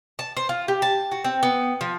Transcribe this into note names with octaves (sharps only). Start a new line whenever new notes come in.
A5
C5
F4
G4
A5
F#4
C4
B3
F3